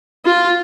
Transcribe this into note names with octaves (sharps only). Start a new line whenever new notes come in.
F4